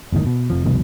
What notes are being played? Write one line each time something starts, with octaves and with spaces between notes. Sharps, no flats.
G1 E2 A2 D#3
B2
F1 F2 F3
C2 F2 B2 D#3